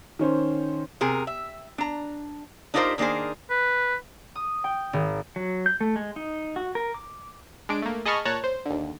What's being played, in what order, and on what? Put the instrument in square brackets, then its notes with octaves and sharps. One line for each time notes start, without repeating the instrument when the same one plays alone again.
[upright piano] D#3 C#4 C5
[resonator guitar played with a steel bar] C3 G#4 A#4
E5
D4 A#5
D4 D#4 F4 G4 A#4 C5
D#3 A#3 D4 G#4 C5
[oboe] B4
[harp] D#6
G5
G#1
[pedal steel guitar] F#3
G6
A3
G#3
D#4
F#4
A#4
D6
[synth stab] G#3 D4 D7
A3 A#3
G#4 D#5 A5 B5 C#6 F6
A#2 C#5 A5 A#5 F#6
C5
D#2 D3